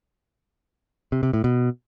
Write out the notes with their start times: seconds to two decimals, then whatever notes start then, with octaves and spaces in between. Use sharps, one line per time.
1.12 C3
1.23 C3
1.33 A2
1.44 B2